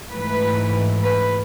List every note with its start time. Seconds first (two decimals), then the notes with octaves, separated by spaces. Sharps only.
0.12 G#2 E3 A3 B4
1.03 B4